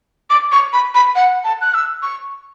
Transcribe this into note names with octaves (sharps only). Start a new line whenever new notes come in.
D6
C#6
B5
B5
F#5
A5
F#6
E6
C#6